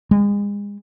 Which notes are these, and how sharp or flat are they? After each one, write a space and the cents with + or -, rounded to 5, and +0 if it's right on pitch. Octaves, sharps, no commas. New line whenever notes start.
G#3 -35